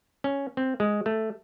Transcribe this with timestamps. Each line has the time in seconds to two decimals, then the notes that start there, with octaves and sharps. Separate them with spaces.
0.24 C#4
0.57 C4
0.80 G#3
1.06 A3